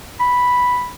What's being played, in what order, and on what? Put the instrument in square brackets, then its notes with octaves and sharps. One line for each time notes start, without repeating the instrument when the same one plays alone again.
[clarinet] B5